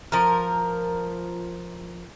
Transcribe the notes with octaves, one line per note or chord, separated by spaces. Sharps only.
F3 A#4